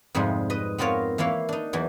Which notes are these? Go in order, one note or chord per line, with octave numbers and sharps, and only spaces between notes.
F2 G#2 C3 F3 G3 G#4
B4 D#5
B3 C4 F4 A#4 C#5 F5
E3 A#3 E4 C#5 F5
D4 D#4
E2 E3 F#3